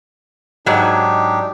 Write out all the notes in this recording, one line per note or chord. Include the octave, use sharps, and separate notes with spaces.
G#2 F#3 D4 D#4 G4